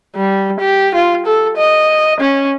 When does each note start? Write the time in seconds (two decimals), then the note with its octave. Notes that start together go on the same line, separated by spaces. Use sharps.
0.16 G3
0.60 G4
0.95 F4
1.26 A4
1.57 D#5
2.20 C#4